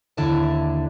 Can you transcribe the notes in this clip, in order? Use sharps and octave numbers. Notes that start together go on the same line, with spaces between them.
D#2 D3 E4 D5 E5 A5